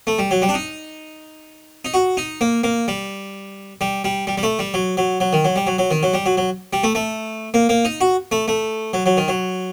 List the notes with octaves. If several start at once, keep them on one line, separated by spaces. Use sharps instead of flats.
A3
G3
F#3
G3
D4
D#4
D#4
F#4
D#4
A#3
A#3
G3
G3
G3
G3
G3
A3
G3
F#3
F#3
F#3
D#3
F#3
G3
F#3
F#3
D#3
F#3
G3
F#3
F#3
G3
A3
A3
A#3
A#3
D#4
F#4
A3
A3
F#3
F#3
D#3
F#3